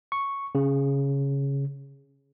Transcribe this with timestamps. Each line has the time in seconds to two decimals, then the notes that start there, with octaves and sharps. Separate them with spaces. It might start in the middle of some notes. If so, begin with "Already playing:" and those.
0.12 C#6
0.55 C#3